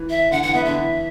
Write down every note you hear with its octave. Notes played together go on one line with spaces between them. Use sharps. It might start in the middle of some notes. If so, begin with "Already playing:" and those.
Already playing: E3
E5
D3 F#5
E3 F#5
B3 E5
D3 E5
E3